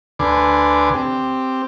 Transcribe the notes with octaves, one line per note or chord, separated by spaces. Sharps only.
D2 D3 B4 G#5 C6 D6
C4 G4